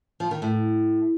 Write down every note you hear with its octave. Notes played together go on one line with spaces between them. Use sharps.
F3
D#3
A2